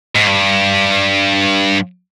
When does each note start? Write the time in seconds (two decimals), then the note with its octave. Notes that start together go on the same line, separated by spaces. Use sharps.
0.15 G#2
0.26 G2